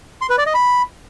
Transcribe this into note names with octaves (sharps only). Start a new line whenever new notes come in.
C6
B4
D5
D#5
B5